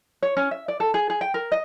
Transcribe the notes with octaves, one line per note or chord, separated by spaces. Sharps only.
C#5
C#4
E5
D5
A4
G#4
G#4
G5
A#4
D#5